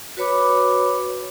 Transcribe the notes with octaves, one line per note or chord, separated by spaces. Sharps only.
F#4 B4 C#5 B5 D6